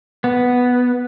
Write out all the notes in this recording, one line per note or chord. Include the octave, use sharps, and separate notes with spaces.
B3